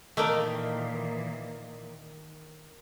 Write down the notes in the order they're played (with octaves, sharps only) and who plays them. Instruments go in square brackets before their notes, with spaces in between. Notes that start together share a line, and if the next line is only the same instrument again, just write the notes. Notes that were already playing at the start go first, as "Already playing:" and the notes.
[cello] A#2 E3 [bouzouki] D#3 [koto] A3 A#3 G5 [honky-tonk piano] A#4 D#5